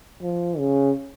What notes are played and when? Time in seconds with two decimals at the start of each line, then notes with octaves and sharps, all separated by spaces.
0.22 F3
0.58 C#3